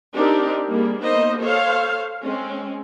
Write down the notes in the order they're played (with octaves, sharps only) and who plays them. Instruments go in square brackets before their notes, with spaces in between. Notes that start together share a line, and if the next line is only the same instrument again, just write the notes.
[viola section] C4 D4 D#4 G4 A#4
G3 A#3 G#4
A#3 B3 D#4 C5 D#5
A4 C5 C#5 F5
G#3 C4 C#4